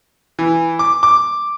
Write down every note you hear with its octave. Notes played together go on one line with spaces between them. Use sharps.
E3
D6
D6